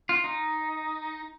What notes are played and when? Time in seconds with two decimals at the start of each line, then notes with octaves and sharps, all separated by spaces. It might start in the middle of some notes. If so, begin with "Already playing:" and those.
0.09 F4
0.24 D#4